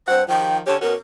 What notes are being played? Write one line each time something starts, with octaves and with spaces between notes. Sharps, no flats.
G2 C5 F#5
D#3 F3 G5
D3 C#4 G4 C#5
B2 C#4 F#4 A#4